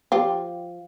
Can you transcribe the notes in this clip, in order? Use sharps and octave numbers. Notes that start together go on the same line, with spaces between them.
F3 F4 G4